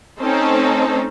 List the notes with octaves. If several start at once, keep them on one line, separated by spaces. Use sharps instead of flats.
A3 C4 C#4 D#4 A4 C5